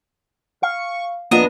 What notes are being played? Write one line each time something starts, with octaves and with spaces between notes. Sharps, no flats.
F5 C#6
F2 A#3 B3 D4 F4 D#5 A#5